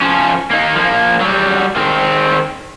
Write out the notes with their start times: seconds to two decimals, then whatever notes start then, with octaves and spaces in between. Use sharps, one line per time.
0.01 F3 C#4
0.51 A#3 D#4
0.75 F3 A#3
1.20 F#3 G3
1.76 D#3 C4